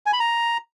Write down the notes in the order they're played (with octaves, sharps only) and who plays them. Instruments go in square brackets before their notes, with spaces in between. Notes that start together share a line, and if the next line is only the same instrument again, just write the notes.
[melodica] G#5
B5
A#5